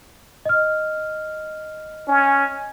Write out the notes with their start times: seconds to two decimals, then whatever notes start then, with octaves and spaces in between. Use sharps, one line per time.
0.45 D#5 F6
2.08 C#4